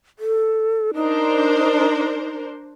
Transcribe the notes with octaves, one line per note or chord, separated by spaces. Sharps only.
A4
D4 D#4 A#4 C5